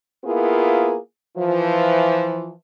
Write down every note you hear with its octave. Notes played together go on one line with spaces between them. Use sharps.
A#3 B3 E4 F4 G#4 A#4
E3 F3